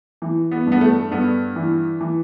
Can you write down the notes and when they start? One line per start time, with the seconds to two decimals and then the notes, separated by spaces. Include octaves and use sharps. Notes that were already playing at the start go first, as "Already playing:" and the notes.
0.22 E3
0.51 B3
0.66 G2
0.72 B3
0.81 A3
1.11 G2 B3
1.56 E3
2.01 E3